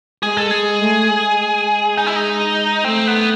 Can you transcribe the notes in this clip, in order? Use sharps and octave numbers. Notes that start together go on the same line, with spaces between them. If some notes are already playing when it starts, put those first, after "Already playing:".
G#3 G#4
A4
G#3 G#4
A3
G#3
D#4
E4
D#4
A3 C4
B3